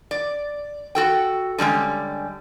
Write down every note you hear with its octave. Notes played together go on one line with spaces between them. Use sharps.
D5
F#4 A4 G5
D3 G3 G#3 C#4